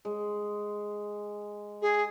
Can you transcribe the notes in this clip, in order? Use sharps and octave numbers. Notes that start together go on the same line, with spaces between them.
G#3
G#4